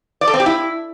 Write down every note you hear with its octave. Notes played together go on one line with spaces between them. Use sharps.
D5
A4
C4
G4
E4